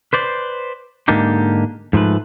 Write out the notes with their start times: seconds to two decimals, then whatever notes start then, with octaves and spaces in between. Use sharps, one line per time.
0.13 B4 C5 D5
1.08 G#2 D3 A#3 D4 D#4 G4
1.93 G#2 F3 A3 B4